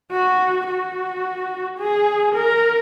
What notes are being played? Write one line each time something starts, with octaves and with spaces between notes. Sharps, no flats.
F#4
F#4
G#4
A#4